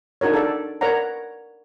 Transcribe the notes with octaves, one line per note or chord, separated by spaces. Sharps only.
D4 D#4 F#4 A#4 C#5
A4 D5
A#4 B4 C#5 D5 F#5 A#5